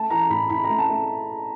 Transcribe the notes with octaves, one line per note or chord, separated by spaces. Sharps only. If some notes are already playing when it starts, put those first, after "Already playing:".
Already playing: A3 A5
E3 A#5
A2 B5
A2 B5
A3 A#5
A5
A3